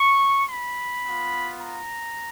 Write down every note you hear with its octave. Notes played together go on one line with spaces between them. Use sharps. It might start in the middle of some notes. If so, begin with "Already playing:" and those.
Already playing: C#6
B5
B3 F4
A#5